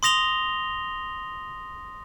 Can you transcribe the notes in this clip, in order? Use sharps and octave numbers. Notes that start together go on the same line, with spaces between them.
C6 D#6 A#6 F7 G7